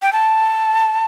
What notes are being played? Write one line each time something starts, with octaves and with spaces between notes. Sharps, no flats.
G5
A5